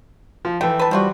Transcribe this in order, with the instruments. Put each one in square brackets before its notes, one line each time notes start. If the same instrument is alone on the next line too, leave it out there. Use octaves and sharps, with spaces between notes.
[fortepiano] F3
[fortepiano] E3 G5 [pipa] A3
[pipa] B4 A5
[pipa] F3 F4 F#4 [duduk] G3